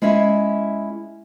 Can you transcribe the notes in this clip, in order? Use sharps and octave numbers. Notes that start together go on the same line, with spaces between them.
G#3 C#4 E4 D5 E5